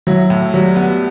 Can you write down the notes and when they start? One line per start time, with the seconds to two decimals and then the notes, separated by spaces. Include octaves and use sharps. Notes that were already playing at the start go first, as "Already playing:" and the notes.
0.07 F#3 E4
0.30 A2
0.53 F#3 G3
0.76 B3